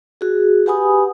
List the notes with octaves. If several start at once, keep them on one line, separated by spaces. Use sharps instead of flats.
F#4 G#4
G4 B4 F#5 G#5 B5 D#6